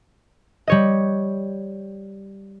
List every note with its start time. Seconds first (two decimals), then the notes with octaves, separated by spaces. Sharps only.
0.67 G3 C#5 D#5